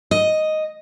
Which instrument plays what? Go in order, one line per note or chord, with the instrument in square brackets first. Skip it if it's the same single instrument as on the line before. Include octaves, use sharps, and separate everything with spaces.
[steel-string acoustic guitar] D#5